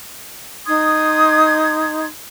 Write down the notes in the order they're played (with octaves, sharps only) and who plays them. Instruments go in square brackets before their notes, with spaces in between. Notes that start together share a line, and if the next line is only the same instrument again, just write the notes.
[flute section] D#4 C6 D#6 G#6